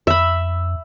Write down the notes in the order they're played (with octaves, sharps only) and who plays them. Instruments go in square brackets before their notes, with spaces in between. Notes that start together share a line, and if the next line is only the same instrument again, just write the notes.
[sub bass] F2 [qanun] E5 B5